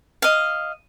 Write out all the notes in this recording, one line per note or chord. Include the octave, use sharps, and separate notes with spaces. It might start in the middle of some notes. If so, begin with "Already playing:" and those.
D#5 F5